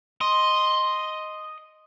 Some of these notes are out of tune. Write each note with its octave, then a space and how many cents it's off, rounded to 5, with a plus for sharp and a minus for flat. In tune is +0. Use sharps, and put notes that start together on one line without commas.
D#5 +0 C6 +0